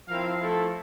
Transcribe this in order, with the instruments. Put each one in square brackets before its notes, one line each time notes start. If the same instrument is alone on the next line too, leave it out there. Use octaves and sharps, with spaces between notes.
[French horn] F3 [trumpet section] C4 E4 A#4 F5
[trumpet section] A3 C4 E4 A4